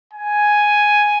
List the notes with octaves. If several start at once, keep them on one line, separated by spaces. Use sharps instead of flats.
G#5